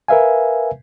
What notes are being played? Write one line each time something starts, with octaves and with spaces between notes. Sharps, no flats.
A#4 B4 E5 F5 G#5